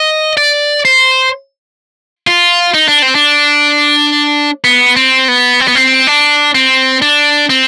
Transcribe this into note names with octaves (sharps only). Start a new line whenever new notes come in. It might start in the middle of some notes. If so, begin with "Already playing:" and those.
Already playing: D#5
D5
C5
F4
D#4
D4
C4
D4
B3
C4
B3
C4
B3
C4
D4
C4
D4
C4